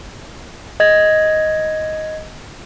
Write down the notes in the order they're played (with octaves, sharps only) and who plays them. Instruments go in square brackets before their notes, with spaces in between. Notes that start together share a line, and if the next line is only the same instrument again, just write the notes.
[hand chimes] D#5 G#6 A#6